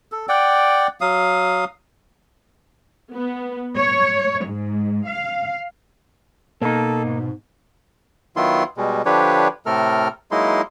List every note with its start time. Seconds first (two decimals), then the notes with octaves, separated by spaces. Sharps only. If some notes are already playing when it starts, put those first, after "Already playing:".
0.12 A4
0.29 D5 F#5 G5
1.01 F#3 F5 D#6
3.14 B3
3.77 C#5
4.48 G#2
5.09 F5
6.61 B2 A#3 D#4 A4
7.04 G#2
8.36 D#3 F#3 B3 E4 F4 C6
8.77 B2 G3 G#3
9.05 D3 F3 D4 G4 B4 C#5
9.66 A2 C3 A3 A4 A#4 F6
10.31 F#3 G#3 A#3 D#4 E4 C6